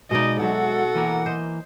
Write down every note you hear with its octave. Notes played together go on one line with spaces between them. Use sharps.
B2 G#3 A#3 D#4 D5 D#5
B2 F#3 F#4 A4 E5 F#5
E3 A#3 A#4
C5 D#5